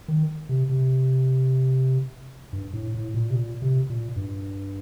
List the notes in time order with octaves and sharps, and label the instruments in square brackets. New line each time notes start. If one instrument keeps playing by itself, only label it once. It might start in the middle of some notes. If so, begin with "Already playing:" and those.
[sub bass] D#3
C3
C3
G2
A2
A2
A#2
C3
A#2
C3
A#2
G2